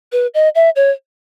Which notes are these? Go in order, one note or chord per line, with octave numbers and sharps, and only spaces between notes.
B4
D#5
E5
C#5